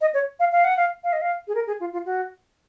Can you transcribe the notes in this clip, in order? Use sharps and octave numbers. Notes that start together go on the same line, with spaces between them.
D#5
C#5
F5
F5
F#5
F5
F5
D#5
F5
G#4
A#4
G#4
F4
F4
F#4